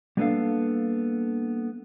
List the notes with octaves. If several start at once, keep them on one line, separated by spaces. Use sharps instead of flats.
G3 A#3 B3 D4 A4 F5